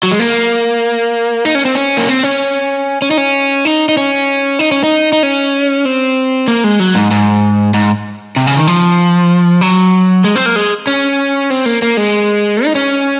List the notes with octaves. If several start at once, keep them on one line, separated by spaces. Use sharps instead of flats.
F#3
G#3
A#3
D#4
C#4
C4
C#4
A#3
C4
C#4
C#4
D#4
C#4
D#4
D#4
C#4
D#4
C#4
D#4
D#4
C#4
C4
A#3
G#3
F#3
G#2
G#2
G#2
C3
C#3
D#3
F3
F#3
G#3
C4
A#3
G#3
C#4
C4
A#3
A#3
G#3
D#4
C#4